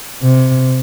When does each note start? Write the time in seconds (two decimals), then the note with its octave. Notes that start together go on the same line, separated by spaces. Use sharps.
0.23 C3